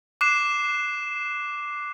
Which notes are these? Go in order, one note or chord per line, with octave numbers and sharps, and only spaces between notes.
D6 F#6 C7 E7